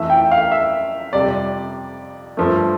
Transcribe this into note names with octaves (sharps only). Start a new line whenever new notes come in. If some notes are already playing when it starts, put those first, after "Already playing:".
Already playing: F2 E3 A3 E5
G5
F5
E5
F2 C3 G3 D5
G2 F3 A3